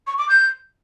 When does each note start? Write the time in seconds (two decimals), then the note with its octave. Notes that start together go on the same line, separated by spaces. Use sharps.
0.07 C#6
0.18 D6
0.29 G6